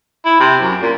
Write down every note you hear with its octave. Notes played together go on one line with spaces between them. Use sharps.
E4
C3
F#2
A#2